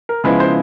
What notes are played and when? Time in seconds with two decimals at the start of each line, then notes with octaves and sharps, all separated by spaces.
0.09 A#4
0.24 C#3 F3 G#3 B3 E4 B4
0.40 C5